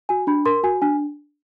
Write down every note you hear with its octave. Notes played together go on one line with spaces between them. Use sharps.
F#4 G#5
D4 B5
A#4 C6
F#4 G#5
D4 G#5